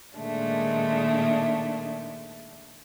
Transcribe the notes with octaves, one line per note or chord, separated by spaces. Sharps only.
A#2 D#3 G#3 A3 D4